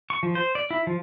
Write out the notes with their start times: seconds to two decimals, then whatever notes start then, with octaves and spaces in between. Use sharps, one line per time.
0.10 C#6
0.23 F3
0.35 C5
0.55 D5
0.71 E4
0.87 F3